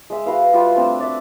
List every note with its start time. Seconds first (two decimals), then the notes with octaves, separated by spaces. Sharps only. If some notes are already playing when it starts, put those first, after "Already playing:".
0.10 G#3 E5
0.26 F#4 B4 F5
0.53 G3 F4 F#4 E5
0.75 A3 C4 D4 E6
1.00 D5 E5